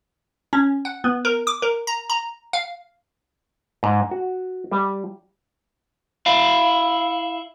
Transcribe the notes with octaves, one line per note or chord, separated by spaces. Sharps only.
C#4
F#5
B3
A#4
D6
A#4
A#5
A#5
F5
G#2
F#4
G3
E4 F5